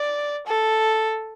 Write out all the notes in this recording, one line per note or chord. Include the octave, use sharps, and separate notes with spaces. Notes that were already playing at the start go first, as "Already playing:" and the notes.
Already playing: D5
A4